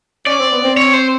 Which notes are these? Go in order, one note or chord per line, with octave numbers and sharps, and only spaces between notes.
C#4 D5
C4
B3
C4
C#5
C5